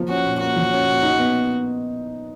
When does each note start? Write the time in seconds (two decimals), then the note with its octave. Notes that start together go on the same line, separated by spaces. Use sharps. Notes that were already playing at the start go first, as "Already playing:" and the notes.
Already playing: F3 A#3
0.09 C#4 F#4
0.25 A#2
0.41 A#3 F#4
0.56 F3
0.72 C#4
0.87 A#2
1.03 D#4
1.18 B3